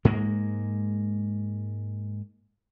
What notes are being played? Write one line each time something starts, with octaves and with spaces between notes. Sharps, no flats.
G#2 G#3 A#3